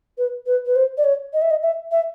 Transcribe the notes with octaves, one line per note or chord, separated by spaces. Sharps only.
B4
B4
B4
C5
D5
C#5
D#5
E5
D#5
E5
E5